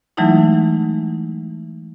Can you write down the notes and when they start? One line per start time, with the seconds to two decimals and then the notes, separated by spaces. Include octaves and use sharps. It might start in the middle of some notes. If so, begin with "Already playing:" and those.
0.17 E3 F#3 G#3 A3 D#4 E4